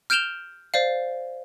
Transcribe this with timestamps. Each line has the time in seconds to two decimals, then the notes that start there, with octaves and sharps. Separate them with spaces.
0.10 F6 G6 D7 E7 F7 G7
0.74 C5 D5 F5